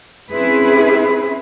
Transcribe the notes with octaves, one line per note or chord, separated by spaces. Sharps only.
C4 C#4 E4 G#4 B4